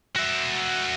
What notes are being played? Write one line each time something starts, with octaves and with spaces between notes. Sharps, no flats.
F#4 E5